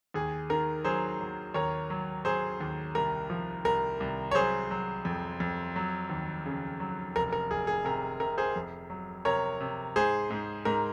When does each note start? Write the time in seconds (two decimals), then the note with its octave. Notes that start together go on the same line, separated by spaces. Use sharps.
0.14 D#2 G#4
0.50 D#3 A#4
0.85 F#3 G#4 C5
1.20 F#3
1.54 D#2 A#4 C#5
1.90 F#3
2.25 F#3 G#4 C5
2.61 D#2
2.95 C2 A#4
3.30 F3
3.64 C2 A#4
4.00 C2
4.31 C#5
4.34 F#3 G#4 C5
4.71 F#3
5.05 F2
5.40 F2
5.76 F#3
6.10 D#2
6.46 C#3
6.80 F#3
7.16 F1 A#4
7.33 A#4
7.51 F1 G#4
7.67 G#4
7.85 C3 A#4
8.20 C3 A#4
8.38 G#4 C5
8.56 F2
8.90 F#3
9.25 C3 A#4 C#5
9.60 C3
9.96 G#2 G#4 C5
10.30 G#2
10.65 G#2 A#4